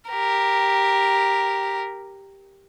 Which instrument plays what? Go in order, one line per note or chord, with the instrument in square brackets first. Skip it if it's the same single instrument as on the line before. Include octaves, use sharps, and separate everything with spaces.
[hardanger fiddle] G4 A#4